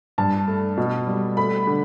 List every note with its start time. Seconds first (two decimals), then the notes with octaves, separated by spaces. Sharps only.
0.18 G2 A5
0.48 A3
0.77 B2
1.07 G3
1.37 A3 B5
1.67 D3